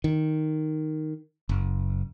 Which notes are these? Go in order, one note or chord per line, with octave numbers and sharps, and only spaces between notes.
D#3
F#1